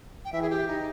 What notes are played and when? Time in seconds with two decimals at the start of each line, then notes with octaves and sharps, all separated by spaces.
0.25 G5
0.33 E3 E5
0.42 G#4
0.50 G4
0.68 D#4